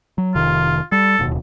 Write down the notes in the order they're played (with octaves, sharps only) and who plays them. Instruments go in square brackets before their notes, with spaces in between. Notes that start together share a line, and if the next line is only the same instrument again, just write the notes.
[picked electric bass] F#3
[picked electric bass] F1 C3 D#3 [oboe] F4
[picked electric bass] G3 [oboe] A4
[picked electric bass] D1 D#2 B2